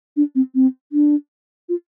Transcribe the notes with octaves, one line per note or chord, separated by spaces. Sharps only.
D4
C4
C4
D4
F4